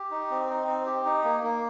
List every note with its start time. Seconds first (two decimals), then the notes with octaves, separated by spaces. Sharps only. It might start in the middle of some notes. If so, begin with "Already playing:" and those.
Already playing: G4
0.11 D#4
0.30 C4
0.49 D#4
0.67 C4
0.86 G4
1.05 D#4
1.24 A#3
1.43 A#3